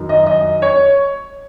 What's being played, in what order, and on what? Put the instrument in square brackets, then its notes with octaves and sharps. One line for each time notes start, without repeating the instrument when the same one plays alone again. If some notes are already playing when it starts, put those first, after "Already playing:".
Already playing: [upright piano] F#2 D#3
D#5
D#5
C#5